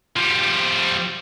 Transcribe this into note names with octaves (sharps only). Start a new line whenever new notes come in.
F3 G3